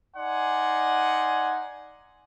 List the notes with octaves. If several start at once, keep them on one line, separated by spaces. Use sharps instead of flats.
D#4 D5 F#5 G#5 C6